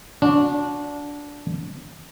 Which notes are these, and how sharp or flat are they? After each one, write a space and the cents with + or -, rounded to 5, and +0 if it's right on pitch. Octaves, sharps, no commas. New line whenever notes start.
D4 -15 F#4 -30